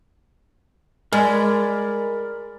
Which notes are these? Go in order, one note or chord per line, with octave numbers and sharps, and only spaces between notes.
G#3 A#4 D5 B5